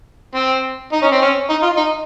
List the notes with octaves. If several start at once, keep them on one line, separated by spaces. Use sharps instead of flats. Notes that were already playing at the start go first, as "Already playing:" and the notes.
C4
D#4
C#4
C4
C#4
D#4
F4
D#4